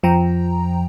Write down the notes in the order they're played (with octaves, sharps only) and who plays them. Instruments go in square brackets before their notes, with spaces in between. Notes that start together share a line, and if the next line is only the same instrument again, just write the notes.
[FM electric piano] F2 F3 G5 A#5